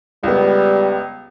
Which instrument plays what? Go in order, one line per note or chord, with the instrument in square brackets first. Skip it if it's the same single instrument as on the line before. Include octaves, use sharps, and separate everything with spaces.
[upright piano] C#2 B3 [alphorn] G3